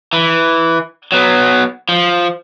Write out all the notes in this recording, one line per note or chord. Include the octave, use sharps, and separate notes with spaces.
E3
F#3 B3
F3